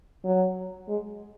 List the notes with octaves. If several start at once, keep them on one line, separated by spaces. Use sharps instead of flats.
F#3
G#3